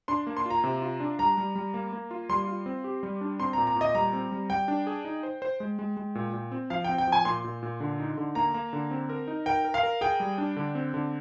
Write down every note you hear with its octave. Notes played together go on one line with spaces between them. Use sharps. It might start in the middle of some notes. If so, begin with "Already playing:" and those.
D4 C6
A#3
C6
F4 A#5
C3
F4
D4
G3 A#5
G3
G3
A#3
A#3
F4
G3 C6
F4
C4
G4
G3
D4
C4 C6
A#2 A#5
A#5
A#2 D#5
G3 A#5
C4
G3
G3 G5
D4
G#4
D#4
C5
C5
G#3
G#3
G#3
A#2
A#2
C4
F3 F5
C4 G5
G5
F3 G#5
A#2 C6
A#2
A#2
D3
D#4
D3
A#3 A#5
A#3
D3
C4
A#4
D#4
A#4 G5
A#4
F5
A#4
G#4 G5
G3
D4
D3
C4
D3